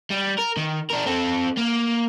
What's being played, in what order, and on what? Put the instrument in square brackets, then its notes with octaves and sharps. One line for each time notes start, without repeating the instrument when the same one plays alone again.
[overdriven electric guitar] G3
A#4
D#3
D4 A#4
C4 A4
A#3